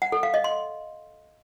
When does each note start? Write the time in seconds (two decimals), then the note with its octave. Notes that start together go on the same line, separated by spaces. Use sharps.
0.02 F#5
0.12 A4
0.23 F5
0.34 D#5
0.44 C6